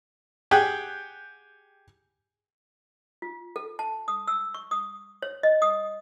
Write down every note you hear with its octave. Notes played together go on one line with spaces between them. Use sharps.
G4 G#4 F#5 G5
F4
A4
A5
D#6
E6
C#6
D#6
C#5
D#5
D#6